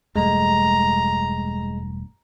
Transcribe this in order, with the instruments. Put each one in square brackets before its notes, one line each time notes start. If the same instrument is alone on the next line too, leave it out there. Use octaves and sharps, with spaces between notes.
[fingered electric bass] E1 G2 A3 [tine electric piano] G#3 [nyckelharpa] A#5